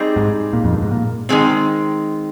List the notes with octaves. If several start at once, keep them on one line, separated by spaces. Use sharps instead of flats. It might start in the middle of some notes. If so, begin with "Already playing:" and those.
Already playing: G3 C4 D#4 G#4
G#2
A#2
F2
G2
G#2
A#2
D#3 G#3 C4